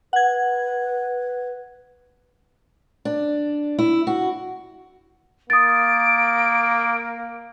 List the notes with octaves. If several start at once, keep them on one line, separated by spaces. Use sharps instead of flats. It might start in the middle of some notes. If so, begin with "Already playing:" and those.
B4 F#5 G#6
D4
E4
F#4
A#3 D#6 A6 D7